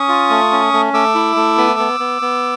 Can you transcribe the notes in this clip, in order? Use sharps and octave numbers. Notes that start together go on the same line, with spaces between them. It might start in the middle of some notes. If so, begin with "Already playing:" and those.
Already playing: C#4 C#6 D#6
F4
A3
C#4
A3
A3 D6 E6
E4
A3
B3
B3
B3
B3